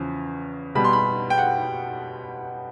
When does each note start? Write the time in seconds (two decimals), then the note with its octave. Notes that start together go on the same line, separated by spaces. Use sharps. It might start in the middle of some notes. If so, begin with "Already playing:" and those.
Already playing: E2 C#3 F3
0.75 B2 G3 B3 B5
0.84 C6
0.93 B5
1.30 G5
1.38 F#5